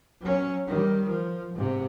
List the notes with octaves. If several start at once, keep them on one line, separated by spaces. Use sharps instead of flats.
F#3 C#4
D#3 G3
F3
G#2 C3